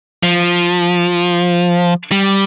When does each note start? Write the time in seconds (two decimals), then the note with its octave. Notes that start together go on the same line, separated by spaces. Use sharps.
0.23 F3
2.12 G3